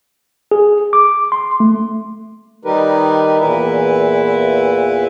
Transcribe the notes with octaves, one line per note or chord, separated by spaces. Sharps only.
G#4
D6
C6
A3
D#3 G3 D#4 G4 A#4 B4
E2 A#2 E3 E4 B4 E5